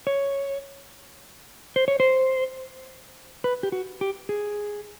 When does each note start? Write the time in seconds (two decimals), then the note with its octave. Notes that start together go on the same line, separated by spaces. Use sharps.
0.07 C#5
1.76 C5
1.88 C#5
2.00 C5
3.44 B4
3.63 G4
3.72 F#4
4.01 G4
4.29 G#4